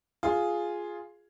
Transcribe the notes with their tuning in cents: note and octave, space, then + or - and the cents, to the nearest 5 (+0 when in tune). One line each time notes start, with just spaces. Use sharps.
F4 +0 G#4 +0